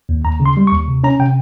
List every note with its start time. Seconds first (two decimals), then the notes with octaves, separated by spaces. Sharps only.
0.09 D#2
0.25 D#2 A#5
0.40 C#3
0.46 C6
0.57 G3
0.67 C#6
0.72 D#2
0.88 C3
1.04 C#4 A#5
1.19 C3 G5